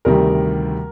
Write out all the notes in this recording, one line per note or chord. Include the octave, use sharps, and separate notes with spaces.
D2 C3 D#3 G3 A#4